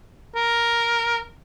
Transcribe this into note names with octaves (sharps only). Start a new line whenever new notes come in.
A#4